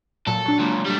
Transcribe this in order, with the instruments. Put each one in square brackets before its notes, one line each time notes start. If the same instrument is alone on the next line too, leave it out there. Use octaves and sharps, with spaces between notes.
[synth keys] A#2 F#3 [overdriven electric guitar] A4
[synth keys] F#3 D4
[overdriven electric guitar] C#2 A#2
G3 A3